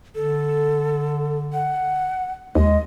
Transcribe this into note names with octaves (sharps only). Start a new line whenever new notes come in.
D3 A4
F#5
D#2 G#3 D#5